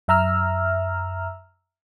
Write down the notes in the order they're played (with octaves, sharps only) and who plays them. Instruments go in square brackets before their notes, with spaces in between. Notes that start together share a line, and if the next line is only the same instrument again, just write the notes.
[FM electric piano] F#2 E5 A#5 E6 F6